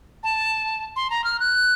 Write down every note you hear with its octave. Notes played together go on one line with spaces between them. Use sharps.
A5
C6
A#5
F6
F#6